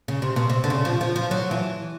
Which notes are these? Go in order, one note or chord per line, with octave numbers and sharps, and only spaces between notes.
C#3
C3
B2
C3
D3
C#3
F3
F3
F3
F#3
E3